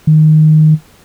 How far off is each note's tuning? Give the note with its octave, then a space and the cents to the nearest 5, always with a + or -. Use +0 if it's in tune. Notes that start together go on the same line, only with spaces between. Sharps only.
D#3 -5